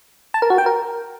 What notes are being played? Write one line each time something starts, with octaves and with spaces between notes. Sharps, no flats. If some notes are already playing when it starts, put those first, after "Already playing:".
A5
A#4
F#4
G5
A#4